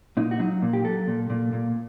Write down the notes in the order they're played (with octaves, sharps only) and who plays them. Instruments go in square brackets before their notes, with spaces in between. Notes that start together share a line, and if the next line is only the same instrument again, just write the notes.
[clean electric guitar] A#2 D#4
F#4
F#3 D#4
A#2
G4
F#3 A4
A#2
A#2
A#2